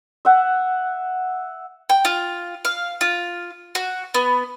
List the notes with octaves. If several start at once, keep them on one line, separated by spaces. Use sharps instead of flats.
E5 F#5
G5
F4
F5
F4
F#4
B3